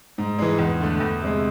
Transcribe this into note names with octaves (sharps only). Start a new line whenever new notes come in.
G#2
E3 G#3
E2
D3 A3
E2
C3 G#3